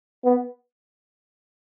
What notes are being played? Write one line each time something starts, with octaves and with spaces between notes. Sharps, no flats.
B3